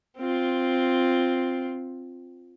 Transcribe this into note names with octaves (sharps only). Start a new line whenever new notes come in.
C4 F4